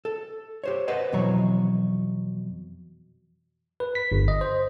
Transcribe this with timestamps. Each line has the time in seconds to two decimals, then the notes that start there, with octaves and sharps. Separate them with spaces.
0.05 A4
0.64 G4 C5 C#5
0.88 B4 C5 D#5 F#5
1.12 F2 B2 E3 F#3 C#5 A#5
3.80 B4
3.95 B6
4.12 G1
4.28 D#5
4.41 C5